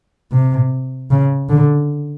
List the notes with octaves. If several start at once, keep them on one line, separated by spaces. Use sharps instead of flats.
C3
C#3
D3